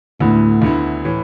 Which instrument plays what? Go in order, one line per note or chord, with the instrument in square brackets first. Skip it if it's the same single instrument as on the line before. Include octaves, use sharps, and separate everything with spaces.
[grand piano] D2 D3 B3 E4 [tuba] A2
[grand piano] D2 D3 B3 E4
A2 E3